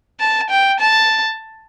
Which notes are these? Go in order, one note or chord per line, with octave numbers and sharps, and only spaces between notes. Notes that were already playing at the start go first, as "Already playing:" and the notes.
A5
G5
A5